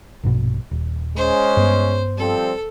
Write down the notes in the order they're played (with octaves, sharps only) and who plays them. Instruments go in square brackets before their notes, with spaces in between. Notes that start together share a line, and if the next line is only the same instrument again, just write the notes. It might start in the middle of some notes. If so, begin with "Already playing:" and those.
[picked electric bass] A#1 G2 B2
D#1
[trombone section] G#3 C#4 [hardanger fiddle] C5
[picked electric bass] G2 B3
[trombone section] F3 G3 C4 [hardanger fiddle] A4